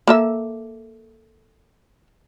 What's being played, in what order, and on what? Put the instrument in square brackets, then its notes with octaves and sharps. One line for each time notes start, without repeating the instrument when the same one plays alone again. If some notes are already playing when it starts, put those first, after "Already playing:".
[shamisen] A#3 A4 E5